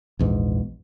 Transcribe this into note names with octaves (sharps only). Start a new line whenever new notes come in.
A#1 E2 G#2